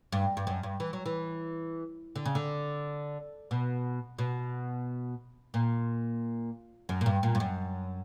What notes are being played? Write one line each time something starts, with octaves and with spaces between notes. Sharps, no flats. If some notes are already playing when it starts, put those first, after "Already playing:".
G2
G2
F#2
G2
E3
F#3
E3
D3
C#3
D3
B2
B2
A#2
F#2
A#2
G2
A#2
G2
F#2